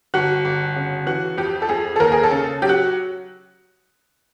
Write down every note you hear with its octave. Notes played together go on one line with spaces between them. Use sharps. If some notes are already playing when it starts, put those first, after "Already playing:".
G1 F#4
G1
C#3
E3 F#4
F2 G4
A4
F2 G#4
A4
D#2 A#4
G#4
A4
C#3
F#3 G4
F#4